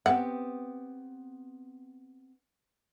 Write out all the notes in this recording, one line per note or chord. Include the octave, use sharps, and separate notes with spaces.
B3 C4 G4 F#5